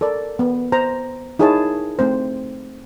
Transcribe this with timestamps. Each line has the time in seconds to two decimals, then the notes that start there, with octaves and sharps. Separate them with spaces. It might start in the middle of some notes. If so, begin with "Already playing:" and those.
0.01 A4 A#4 D5
0.39 B3
0.72 C5 A#5
1.39 D#4 E4 G#4 A#4 C#5 A5
1.99 A3 C4 C5